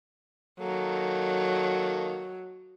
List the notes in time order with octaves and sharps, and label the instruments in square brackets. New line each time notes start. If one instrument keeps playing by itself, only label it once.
[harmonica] D#3 A#3 A4 [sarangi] F#3